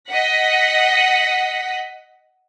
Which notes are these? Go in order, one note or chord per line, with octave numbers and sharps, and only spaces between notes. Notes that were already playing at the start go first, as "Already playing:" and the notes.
D#5 F#5 B6